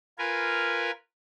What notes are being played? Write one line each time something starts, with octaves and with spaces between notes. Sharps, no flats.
F4 A#4 B4 G#5